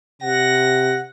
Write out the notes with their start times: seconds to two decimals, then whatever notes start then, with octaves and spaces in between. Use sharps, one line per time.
0.22 C3 F#5 A#6